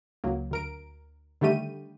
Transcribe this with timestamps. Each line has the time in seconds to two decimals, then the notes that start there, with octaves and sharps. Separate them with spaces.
0.24 C#2 F#3 A#3
0.51 D2 A#4 D7
1.41 D3 D#3 G3 A3 G4 D#7